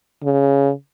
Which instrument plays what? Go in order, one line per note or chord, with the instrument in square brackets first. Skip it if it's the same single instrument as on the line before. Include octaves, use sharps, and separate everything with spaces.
[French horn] C#3